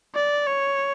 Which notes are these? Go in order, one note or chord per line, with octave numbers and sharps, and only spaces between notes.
D5
C#5